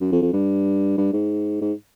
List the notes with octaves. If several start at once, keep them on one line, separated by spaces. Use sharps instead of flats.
F#2
F2
F2
G2
G2
G#2
G#2